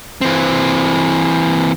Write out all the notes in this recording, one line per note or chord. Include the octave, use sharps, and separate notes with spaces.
E3 C4